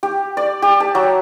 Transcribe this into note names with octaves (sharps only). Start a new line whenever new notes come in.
G4
D5
G4
A5
F#3